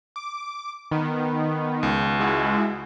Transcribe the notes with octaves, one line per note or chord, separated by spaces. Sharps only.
D6
D#3 B3
C#2
G#3 E4 F#4